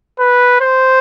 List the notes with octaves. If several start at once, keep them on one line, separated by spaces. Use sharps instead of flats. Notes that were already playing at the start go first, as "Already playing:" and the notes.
B4
C5